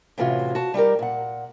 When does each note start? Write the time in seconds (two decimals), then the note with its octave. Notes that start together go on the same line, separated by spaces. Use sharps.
0.18 A2 C3 E3 C#4 F4 F#4
0.55 F#4 A5
0.74 G3 D#4 G4 A#4
0.99 A#2 F#5